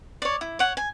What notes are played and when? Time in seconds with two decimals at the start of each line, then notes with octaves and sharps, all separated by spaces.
0.22 C#5 D5
0.41 E4
0.59 C#5 F#5
0.77 G#5